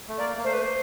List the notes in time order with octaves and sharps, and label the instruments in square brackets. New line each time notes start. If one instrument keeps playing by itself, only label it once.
[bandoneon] A3
[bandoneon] A#3 [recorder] D5
[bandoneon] A#3
[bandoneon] A3 [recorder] C5
[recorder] B4
C5